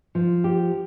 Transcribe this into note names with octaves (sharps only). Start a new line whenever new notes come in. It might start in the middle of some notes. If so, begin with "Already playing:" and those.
F3
G4